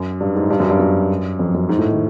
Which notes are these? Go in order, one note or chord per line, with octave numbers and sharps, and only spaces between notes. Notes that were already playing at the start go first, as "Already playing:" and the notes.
Already playing: F#2
G2
G#2
G2
F#2
G2
F#2
F2
F#2
G#2
A2
D#3